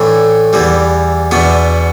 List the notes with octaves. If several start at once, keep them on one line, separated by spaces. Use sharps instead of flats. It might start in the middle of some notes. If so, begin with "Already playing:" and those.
Already playing: A2 E3 A3 D4
E2 E3 G3
E2 B2 B3 D4